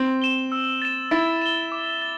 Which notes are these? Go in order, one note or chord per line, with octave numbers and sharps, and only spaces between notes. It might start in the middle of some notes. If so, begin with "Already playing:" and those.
Already playing: C4
E7 G7
E6
A6 E7
E4 A6
E7 G7
D6
A6